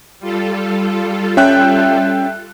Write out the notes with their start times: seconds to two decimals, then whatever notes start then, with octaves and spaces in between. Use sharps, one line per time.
0.20 G3 F4 A4
1.37 C#4 E5 G5 F#6